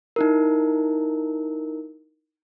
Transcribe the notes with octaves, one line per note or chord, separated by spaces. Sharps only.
D#4 E4 A#4